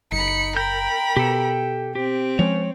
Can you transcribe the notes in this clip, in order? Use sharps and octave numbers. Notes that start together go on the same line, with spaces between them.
F#1 D#4 B5 C#7
A#4 G5 B5 G6
B2 G4 A4
C4 G4
F3 G#3 C#4 C#5